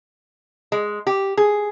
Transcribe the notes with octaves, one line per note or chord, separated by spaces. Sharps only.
G#3
G4
G#4